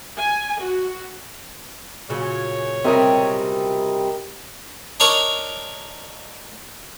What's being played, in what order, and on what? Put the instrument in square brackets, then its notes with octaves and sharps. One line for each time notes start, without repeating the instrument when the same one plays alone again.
[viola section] G#5
F#4
[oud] A#2 C#3 F#3 [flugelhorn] C#5
[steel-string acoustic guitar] C3 G3 [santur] A#4 D#5 G5
[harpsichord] D4 D#4 A#4 C#5 D5 C#6